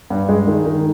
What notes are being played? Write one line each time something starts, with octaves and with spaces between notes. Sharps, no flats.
G2
G#3
D#3
D#3